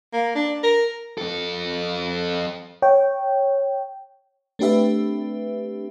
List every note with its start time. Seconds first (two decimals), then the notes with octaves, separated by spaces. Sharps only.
0.13 A#3
0.35 D4
0.63 A#4
1.18 F2 A4
2.82 C#5 G5
4.59 A3 C4 D4 G4 B4 E5